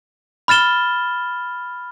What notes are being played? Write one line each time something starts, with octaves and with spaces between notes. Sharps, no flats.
B5 F6 A6 E7 G7